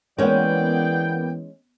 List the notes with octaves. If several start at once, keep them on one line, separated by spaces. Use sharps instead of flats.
E3 G#3 A#3 B3 C#4 G#4 D5 G5